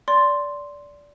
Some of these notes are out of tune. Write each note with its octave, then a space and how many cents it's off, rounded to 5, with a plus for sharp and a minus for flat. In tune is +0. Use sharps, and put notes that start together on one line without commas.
D5 -20 C6 +0